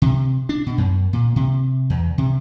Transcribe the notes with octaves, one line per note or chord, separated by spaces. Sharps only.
C3
D4
B2
F#2
A#2
C3
E2
C3